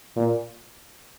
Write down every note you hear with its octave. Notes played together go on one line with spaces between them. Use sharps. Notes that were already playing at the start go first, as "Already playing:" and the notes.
A#2